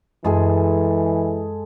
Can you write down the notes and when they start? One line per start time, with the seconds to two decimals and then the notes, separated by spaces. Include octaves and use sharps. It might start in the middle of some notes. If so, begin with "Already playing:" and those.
0.25 F#2 E3 G#3 G#4 A4